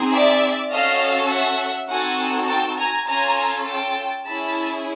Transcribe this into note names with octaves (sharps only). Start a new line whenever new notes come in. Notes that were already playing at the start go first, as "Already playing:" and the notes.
Already playing: C4 D#4 G#4
D5 E5
C#4 F#4 A4 D#5 F5
E5 F#5
C4 D#4 F#4 A4 F#5 G#5
G5 A5
G#5 A#5
C#4 F4 A4 G#5 A#5
G5 A5
C#4 E4 G#4 A5 B5